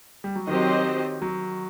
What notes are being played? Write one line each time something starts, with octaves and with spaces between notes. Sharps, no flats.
G3
F#3
D#3 F#3 C4 G4 C5 D#5
F#3